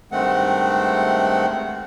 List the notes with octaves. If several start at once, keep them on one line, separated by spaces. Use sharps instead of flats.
G2 D#3 G#3 A3 C4 F#5